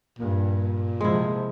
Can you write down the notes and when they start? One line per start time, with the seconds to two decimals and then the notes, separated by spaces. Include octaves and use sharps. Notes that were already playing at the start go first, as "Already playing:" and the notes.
0.19 G2 A#2
1.01 C3 F3 G#3 E4